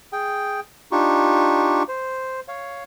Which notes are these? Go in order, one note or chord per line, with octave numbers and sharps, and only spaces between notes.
G#4 G5
D4 D#4 F4 G4 C#6
C5
C#5 F5